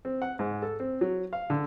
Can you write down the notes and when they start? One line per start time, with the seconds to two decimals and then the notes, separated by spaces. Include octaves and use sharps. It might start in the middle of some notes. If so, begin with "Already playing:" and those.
0.05 C4
0.22 F#5
0.39 G#2
0.62 A4
0.80 C4
1.01 F#3
1.33 F5
1.50 D3